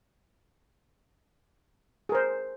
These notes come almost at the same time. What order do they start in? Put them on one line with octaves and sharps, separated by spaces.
G#4 A#4 C5